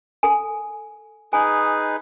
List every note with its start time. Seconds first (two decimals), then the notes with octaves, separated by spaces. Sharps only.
0.23 A4 G#5
1.33 D#4 G#4 B4 G#5